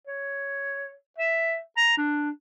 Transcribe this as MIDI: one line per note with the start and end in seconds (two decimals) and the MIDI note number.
0.07 0.94 73
1.18 1.58 76
1.77 1.94 82
1.97 2.30 62